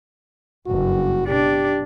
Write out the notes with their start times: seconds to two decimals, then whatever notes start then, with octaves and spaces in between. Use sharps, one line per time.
0.66 F#1 G2 F#4
1.28 B2 D4 G4